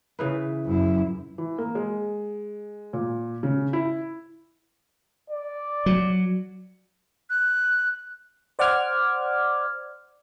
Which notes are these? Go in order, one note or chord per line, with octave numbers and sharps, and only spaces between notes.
C#3 E3 B4
F#2 E4
E3
A#3
G#3
A#2
C#3
E4
D5
F#3
F#6
C5 D5 F#5 D6 F6 G#6